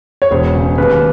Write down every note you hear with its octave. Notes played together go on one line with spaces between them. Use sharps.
C#5
E1 C5
C#3
D#2 B4